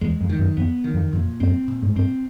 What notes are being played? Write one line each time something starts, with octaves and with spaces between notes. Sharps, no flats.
E2 G#3
F2
D#3
F#2
F2 B3
D#3
F2
F2 A#2
F#2 C4
A#2
G#2
G2 C4